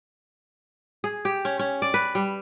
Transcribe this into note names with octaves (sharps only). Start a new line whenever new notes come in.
G#4
G4
C#4
C#4
D5
B4
G3